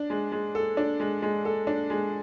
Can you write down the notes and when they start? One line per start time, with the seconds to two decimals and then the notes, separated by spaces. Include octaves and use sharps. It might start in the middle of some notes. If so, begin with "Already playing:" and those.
Already playing: D4
0.10 G#3
0.32 G#3
0.55 A4
0.77 D4
1.00 G#3
1.22 G#3
1.45 A4
1.67 D4
1.90 G#3